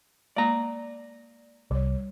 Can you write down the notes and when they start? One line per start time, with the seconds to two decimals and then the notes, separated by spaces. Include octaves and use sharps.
0.36 G#3 A#3 D5 A#5
1.71 C2 G3 C#5